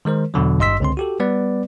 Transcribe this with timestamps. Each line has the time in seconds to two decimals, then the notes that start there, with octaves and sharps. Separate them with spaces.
0.05 D#3 G#3 A#4 C5
0.34 E2 B2 D3 F#3
0.59 G#1 G2 D#5 C6 E6 B6
0.80 C#2 D3 C4 C6
0.97 F#4 G4 A4
1.20 G3 B3 B4 D5